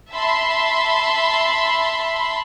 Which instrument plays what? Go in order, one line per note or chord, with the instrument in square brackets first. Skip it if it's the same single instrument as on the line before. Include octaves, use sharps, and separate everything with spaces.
[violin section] E5 A5 B5 C6